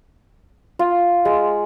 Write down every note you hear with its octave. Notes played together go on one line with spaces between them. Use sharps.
F4
G#3